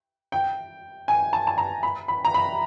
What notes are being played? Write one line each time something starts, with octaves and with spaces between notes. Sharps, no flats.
G5
G#5
A5
A5
A#5
B5
B5
A#5
B5